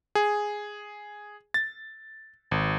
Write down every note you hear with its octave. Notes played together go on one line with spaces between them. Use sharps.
G#4
A6
G#1